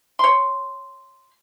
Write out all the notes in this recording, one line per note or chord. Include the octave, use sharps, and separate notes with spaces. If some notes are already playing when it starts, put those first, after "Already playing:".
C#5 C6